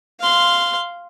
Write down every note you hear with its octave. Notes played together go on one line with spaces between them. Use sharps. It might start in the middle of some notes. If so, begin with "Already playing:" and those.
F5 C6